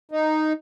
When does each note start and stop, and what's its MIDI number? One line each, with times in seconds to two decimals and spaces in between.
0.11 0.53 63